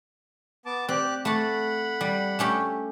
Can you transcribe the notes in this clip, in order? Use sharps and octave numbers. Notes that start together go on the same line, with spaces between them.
B3 A5 D6
C4 G4 D5 F#6
A3 F#5 A5 B5
G3
A3 C#4 G4